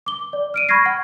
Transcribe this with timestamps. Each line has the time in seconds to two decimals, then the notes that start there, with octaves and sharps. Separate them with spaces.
0.06 D6 G7
0.33 D5
0.54 F6 D7 D#7
0.69 B5 C#6 F6 G#6 A#6 C7
0.86 F#5